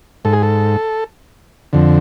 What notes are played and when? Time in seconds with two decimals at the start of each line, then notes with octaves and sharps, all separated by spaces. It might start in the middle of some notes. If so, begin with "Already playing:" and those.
0.25 G#2 A4
0.33 G#4
0.43 A4
1.73 F2 D3